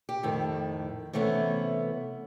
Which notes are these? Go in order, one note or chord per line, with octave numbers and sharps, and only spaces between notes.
G4
F2 A2 D#3
C3 E3 A3 B3 C#4